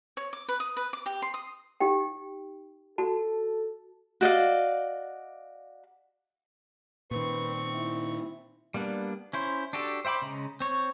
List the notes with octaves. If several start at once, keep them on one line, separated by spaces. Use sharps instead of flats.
C#5
D6
B4
D#6
B4
D6
G4
C6
D#6
D#4 G4 G5
F#4 A4 A5
F#4 D5 D#5 F5
A#2 D#3 C4 B4 C#6
E4
G3 A#3 B3 D4
C#4 E4 C5
D4 F#4 G4 A4
C5 E5 G5 B5 D6
C#3 G#3 A#5
C4 C#5